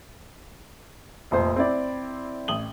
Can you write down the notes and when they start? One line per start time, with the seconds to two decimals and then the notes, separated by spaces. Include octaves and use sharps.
1.31 F1 F2 A#2 C5
1.56 C4 E4 D5
2.48 A1 D#6 F#7 G7